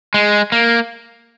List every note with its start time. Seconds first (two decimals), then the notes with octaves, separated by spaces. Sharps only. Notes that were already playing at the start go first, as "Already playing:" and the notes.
0.14 G#3
0.52 A#3